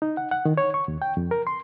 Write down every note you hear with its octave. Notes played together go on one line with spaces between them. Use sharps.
D#4
F#5
F#5
D#3
C#5
C#6
D#2
G5
F2
A#4
C6